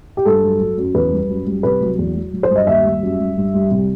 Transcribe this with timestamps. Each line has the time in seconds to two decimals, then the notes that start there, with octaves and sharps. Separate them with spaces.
0.17 G4
0.25 G2 A4
0.43 F#3
0.60 F#3
0.78 F#2
0.94 E2 B4
1.12 G3
1.29 F#2
1.46 G3
1.63 C2 B4
1.81 F#3
1.98 E2
2.16 F#3
2.33 F#3
2.43 C5
2.50 G2
2.56 D#5
2.67 D#2 E5
2.85 G3
3.02 F#2
3.19 G3
3.37 G2
3.54 G3
3.71 C2